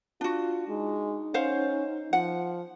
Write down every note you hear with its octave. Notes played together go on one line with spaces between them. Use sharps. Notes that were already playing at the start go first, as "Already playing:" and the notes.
D4 F4 F#4
G#3 D#4
C#4 C5 F5 F#5
F3 F#5